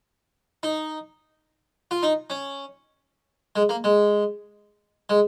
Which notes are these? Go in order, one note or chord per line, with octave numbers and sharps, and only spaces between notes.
D#4
F4
D#4
C#4
G#3
A#3
G#3
G#3